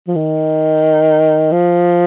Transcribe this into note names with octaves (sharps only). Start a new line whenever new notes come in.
F3
D#3
F3